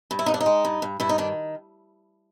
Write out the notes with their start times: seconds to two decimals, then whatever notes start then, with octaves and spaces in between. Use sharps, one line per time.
0.11 G2
0.19 E4
0.26 G2 D#4
0.34 D4
0.40 D#4
0.46 G#3
0.65 G2
0.82 G2
1.00 G2 E4
1.09 D#4
1.18 D#3 D4